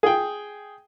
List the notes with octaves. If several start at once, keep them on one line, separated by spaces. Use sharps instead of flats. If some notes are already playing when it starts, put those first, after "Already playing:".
G#4 G5